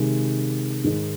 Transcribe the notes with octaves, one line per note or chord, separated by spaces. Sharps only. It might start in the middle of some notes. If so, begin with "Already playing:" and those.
Already playing: C3 D#3 G#3
G#2 D#3 G#3